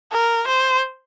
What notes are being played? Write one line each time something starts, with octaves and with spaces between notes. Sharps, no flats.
A#4
C5